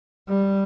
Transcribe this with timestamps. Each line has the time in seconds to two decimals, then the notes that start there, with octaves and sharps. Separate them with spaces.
0.28 G3